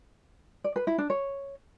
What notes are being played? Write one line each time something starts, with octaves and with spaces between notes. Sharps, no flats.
D5
B4
E4
D4
C#5